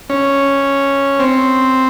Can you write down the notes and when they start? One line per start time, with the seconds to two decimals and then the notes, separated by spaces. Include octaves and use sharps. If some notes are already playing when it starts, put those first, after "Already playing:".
0.10 C#4
1.19 C4